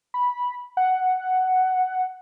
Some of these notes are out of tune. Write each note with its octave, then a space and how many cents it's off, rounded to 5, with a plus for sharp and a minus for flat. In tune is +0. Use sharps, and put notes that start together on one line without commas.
B5 -10
F#5 +5